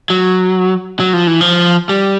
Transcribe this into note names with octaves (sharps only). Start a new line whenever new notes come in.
F#3
F#3
F3
E3
F3
G3